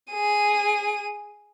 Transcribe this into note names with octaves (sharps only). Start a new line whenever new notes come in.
G#4 D#7